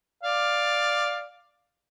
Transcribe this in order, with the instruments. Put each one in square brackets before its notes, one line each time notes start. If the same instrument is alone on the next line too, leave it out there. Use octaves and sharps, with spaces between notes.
[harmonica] D5 F5